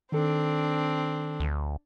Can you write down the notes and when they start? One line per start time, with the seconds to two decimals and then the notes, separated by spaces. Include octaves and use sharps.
0.12 D#3 C4 D4 A4
1.40 D2